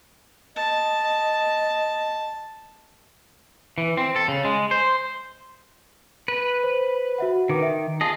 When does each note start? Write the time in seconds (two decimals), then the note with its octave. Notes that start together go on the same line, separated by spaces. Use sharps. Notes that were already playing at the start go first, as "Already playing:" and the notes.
0.56 D#5 A5
3.78 E3
3.97 C4
4.16 A4
4.28 C#3
4.45 G#3
4.71 C5
6.28 B4 D#7
6.64 C5
7.18 F#4 E5 F#5
7.49 D#3 B4 D6
7.62 E5
8.01 F4 G#4 D#5 A5